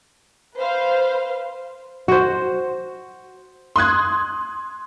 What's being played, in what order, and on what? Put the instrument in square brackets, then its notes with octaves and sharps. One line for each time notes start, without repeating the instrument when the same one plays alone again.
[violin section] B4 C5 F5
[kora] F#4 C5
[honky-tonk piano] C6 D#6 F#6 G#6